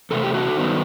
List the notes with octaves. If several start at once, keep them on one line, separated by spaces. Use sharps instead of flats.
E2 C3 A3 A4
G4
F#4 A4
G2 D#3 F#3 B3